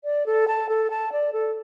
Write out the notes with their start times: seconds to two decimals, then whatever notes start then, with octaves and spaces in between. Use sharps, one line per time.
0.04 D5
0.26 A4
0.48 A5
0.69 A4
0.90 A5
1.12 D5
1.33 A4